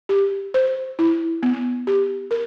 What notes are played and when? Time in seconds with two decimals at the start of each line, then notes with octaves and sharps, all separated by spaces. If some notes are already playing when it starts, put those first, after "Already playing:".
0.09 G4
0.54 C5
0.99 E4
1.43 B3
1.87 G4
2.31 A#4